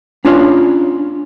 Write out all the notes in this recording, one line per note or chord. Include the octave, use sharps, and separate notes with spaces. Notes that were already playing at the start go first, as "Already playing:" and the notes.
C#4 D4 F4 C#5